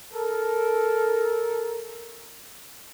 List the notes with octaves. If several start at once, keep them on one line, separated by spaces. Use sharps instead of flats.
A4 A#4